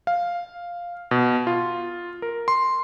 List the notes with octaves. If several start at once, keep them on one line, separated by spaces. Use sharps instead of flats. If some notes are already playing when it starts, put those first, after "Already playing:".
F5
B2
F4
A#4
C6